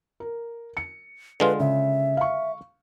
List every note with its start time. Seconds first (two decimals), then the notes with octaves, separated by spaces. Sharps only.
0.20 A#4
0.77 C#7
1.40 D3 G#3 F4 B4
1.60 C#3 E5
2.17 F5 C#6